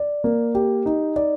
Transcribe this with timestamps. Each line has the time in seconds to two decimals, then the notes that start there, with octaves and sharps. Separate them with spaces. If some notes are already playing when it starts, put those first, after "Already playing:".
Already playing: D5
0.24 A#3
0.55 G4
0.86 D#4
1.16 D5